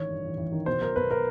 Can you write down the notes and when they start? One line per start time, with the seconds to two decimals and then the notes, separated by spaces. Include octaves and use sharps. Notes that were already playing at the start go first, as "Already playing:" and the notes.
Already playing: A1 D#3 C#5
0.09 G2
0.24 A1
0.37 A1
0.52 D#3
0.66 B2 C5
0.81 B1 A#4
0.96 B2 B4
1.11 A#4